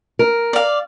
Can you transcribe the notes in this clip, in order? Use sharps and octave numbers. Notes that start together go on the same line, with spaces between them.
A#4
D5 F5